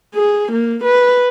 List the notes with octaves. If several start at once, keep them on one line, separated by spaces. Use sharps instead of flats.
G#4
A#3
B4